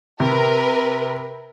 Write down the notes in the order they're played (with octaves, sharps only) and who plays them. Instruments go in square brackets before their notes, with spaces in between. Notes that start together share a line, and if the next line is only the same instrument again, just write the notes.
[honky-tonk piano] C3 [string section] A#4 B4